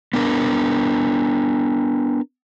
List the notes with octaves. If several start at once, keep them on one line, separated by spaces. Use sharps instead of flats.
B3 D4 A#4